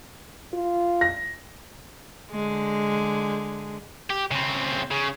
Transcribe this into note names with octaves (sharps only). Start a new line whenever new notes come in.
F4
A#6
D3 G#3
G4
C#3 C4
C#3